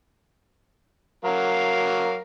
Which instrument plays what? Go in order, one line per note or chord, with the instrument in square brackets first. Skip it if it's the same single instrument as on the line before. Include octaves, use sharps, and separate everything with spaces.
[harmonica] F#3 A#4 F5